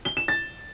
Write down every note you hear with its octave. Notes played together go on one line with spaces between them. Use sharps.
G7
E7
A6